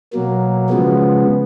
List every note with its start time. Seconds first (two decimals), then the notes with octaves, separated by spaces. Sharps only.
0.13 B2 F#3 A#3
0.69 C#3 F3 G#3 B3